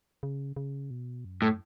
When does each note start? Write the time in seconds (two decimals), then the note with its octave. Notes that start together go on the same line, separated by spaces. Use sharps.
0.23 C#3
0.56 C#3
0.91 B2
1.25 F#2
1.42 A2